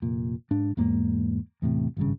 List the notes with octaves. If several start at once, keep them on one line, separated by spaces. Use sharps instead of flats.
F1 A#2
G#2 D4
E2 G#2 A#3
E2 A2 C3
G#1 G2 C#3